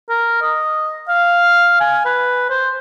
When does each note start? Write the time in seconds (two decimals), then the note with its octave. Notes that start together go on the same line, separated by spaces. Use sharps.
0.10 A#4
0.42 D#5
1.09 F5
1.81 G#5
2.05 B4
2.50 C5